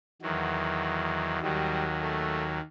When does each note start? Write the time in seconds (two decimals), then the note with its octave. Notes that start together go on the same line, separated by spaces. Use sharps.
0.22 E2 D#3 F#3
1.41 D#2 D#3 F#3 G3
2.01 A3